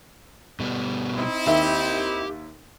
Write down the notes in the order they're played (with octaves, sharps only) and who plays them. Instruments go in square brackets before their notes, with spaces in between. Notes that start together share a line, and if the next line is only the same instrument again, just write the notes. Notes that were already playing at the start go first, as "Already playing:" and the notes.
[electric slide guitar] B2 G3 B3
[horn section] C4 D#4 E4
[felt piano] D#2 E5 [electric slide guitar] G4